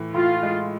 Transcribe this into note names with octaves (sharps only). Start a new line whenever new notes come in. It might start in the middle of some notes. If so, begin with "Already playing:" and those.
Already playing: A2 E3
A2 F4
G#3